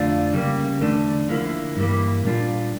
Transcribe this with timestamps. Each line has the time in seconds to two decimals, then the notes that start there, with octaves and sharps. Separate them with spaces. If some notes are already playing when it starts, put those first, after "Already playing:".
Already playing: F2 D3 A3 D4 F4
0.33 C#3 G3 A#3
0.81 E2 D3 A3 D4
1.29 D3 F3 A#3 E4
1.76 G2 E3 G3 A#3
2.24 A#2 G3 D4 F4